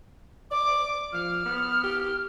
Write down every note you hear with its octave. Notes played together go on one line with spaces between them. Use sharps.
D5 D6
F3 F6
B3
G4